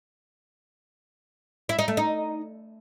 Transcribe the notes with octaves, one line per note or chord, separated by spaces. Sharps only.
E4
D#4
A3
D#4